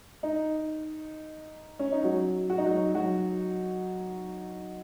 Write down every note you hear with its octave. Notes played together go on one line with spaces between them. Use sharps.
D#4
C#4
D#4
F#3 F#4
F#4
D#4
F#3 F#4
F#3 F#4